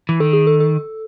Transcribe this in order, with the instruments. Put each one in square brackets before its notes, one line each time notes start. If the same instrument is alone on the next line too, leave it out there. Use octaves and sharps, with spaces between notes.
[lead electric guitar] E3
[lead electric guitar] D#3 [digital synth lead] A4
[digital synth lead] G#4
A4
A4